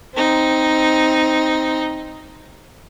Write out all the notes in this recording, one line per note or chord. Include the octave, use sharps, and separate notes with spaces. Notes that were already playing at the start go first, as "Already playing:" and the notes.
C4 D#4